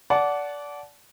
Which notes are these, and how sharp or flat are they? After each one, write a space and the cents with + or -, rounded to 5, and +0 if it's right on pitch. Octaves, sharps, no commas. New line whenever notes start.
D5 -20 F#5 +0 A5 -25